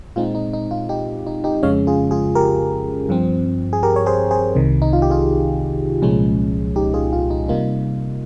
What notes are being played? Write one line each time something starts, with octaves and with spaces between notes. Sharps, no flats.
A#2 G#3 C4 D#4 F4
D#4
D#4
F4
D#4 G4
D#4
D#4 G4
F2 C#3 G#3 C#4 C#5 F5
F4 G#4
F4 G#4
G4 A#4
G2 F3 C4
G#4
G4 A#4
C#5
G#4 C5
G#4 C5
C2 C3 D#3
D#4
F4
G4
F4 G#4
C2 A#2 F3 G#3 C#4
D#4 G4
F4 G#4
F4
D#4
C3 G3 A#3 D#4 F4